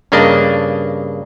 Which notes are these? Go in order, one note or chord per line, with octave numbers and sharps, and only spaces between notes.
G2 C#3 A#3 D4 D#5